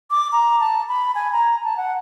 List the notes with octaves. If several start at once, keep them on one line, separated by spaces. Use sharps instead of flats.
D6
A#5
A5
B5
G#5
A#5
A5
F#5